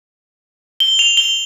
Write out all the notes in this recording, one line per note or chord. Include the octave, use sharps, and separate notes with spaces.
G7
F7
G7